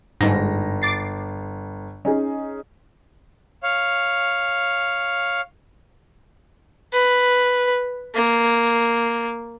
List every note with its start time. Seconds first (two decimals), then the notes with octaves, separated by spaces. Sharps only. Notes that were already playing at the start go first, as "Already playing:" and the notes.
0.21 G1 G#2 A#6
0.82 D6 A6 C7
2.05 C#4 D#4 G#4
3.63 C#5 F5
6.93 B4
8.15 A#3